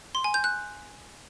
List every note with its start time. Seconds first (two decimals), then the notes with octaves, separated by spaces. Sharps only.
0.15 C6
0.24 G#5
0.34 G6
0.44 F#6